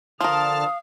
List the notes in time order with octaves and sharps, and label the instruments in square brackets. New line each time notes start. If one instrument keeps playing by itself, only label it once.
[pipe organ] D3 A5 F6 [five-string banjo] F3 A#4 [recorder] F5 [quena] D#6